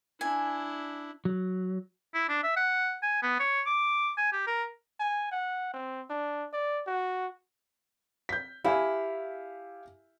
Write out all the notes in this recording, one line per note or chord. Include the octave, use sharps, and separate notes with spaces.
D4 E4 G#5
F#3
E4
D4
E5
F#5
G#5
B3
C#5
D6
G#5
G4
A#4
G#5
F#5
C4
D4
D5
F#4
G6 B6
E4 G4 F5 G#5